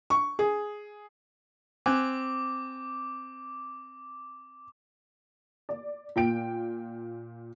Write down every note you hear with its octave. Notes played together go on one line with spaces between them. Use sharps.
C#6
G#4
C4 G#5 D6 F#6
D5
A#2 G5 D7